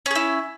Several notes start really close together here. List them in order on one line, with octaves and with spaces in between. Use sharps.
C#4 G#4 E4